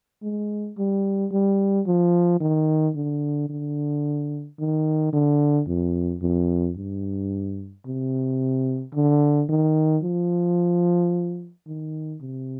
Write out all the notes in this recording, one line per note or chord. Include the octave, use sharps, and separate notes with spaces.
G#3
G3
G3
F3
D#3
D3
D3
D#3
D3
F2
F2
G2
C3
D3
D#3
F3
D#3
C3